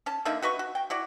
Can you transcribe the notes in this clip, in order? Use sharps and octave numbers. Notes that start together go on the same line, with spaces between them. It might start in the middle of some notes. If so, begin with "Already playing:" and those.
C#4 A5
D3 A#3 D#4 E5
F#4 B4 D#5 C#6
F#4
G5
E4 F#4 D5